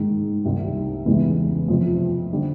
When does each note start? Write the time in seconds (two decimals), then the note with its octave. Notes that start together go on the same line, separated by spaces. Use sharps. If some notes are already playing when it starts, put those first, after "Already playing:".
Already playing: G#2 D#3 G#3
0.44 C2 C3 D#3 G3
1.06 E2 C#3 E3 G#3 B3
1.68 F2 C3 F3
2.33 D3 G3